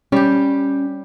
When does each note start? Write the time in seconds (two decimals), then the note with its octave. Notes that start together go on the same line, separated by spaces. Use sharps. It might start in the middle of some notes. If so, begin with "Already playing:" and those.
0.12 G3 C#4 G4